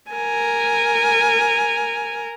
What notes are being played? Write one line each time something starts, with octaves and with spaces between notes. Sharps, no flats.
A#4 G#5